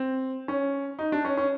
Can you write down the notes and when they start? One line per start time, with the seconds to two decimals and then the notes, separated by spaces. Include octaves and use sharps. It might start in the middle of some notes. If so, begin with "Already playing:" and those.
Already playing: C4
0.48 C#4
0.99 D#4
1.12 D4
1.25 C#4
1.37 C#4